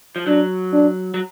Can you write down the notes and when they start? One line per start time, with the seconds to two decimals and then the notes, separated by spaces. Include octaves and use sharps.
0.16 F3
0.27 F#3 D4
0.73 D4
1.14 F#3